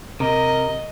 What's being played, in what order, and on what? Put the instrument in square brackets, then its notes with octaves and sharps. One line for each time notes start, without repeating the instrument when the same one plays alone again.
[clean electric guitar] C3 [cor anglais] A#4 [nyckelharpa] D#5